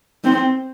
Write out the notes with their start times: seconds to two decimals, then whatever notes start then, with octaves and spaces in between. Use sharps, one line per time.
0.24 C4